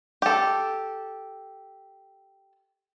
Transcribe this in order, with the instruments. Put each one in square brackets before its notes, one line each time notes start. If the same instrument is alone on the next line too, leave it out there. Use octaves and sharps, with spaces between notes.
[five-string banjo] G4 A4